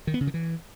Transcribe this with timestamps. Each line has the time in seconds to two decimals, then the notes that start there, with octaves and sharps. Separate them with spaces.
0.07 D#3
0.14 B3
0.21 C#3
0.27 D#3
0.34 E3